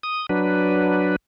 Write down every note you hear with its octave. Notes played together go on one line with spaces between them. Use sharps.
D#6
F#3 D4 B4